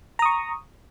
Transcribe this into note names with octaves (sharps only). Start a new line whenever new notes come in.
A#5 C#6 D#6